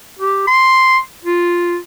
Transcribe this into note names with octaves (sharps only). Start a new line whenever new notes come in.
G4
C6
F4